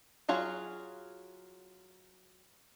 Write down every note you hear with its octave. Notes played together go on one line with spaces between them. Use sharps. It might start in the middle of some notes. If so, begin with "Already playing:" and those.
F#3 F4 F#4 G#4